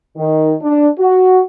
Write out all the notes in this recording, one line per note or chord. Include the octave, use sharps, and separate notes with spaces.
D#3
D4
F#4